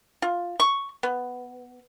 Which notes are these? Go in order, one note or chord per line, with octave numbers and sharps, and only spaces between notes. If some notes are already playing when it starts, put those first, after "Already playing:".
F4
C#6
B3